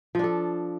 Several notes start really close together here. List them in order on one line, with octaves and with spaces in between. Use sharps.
F3 D4 A4